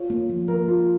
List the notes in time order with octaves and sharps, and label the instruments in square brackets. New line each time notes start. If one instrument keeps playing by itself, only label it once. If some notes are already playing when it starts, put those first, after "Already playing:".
Already playing: [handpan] F4 [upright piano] C#5
[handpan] A#3
F3
[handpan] A#3 [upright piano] A#4
[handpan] A#3 [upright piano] F4